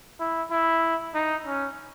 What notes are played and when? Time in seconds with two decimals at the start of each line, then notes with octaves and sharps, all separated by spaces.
0.20 E4
0.50 E4
1.14 D#4
1.46 C#4